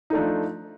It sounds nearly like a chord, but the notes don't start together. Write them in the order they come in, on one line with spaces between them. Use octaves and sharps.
D#4 A3 D4 F3